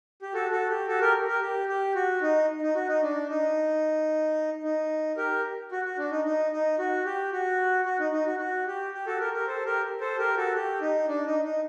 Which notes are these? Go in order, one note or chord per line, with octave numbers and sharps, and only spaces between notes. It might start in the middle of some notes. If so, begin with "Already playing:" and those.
G4
F#4 A4
F#4 A4
G4
F#4 A4
G4 A#4
G4 A#4
G4
G4
F#4
D#4
D#4
F#4
D#4
D4
D#4
D#4
G4 A#4
F#4
F#4
D4
D#4
D#4
D#4
F#4
G4
F#4
F#4
D#4
D#4
F#4
F#4
G4
G4
F#4 A4
G4 A#4
G4 A#4
A4 C5
G4 A#4
A4 C5
G4 A#4
F#4 A4
G4
D#4
D4
D#4
D#4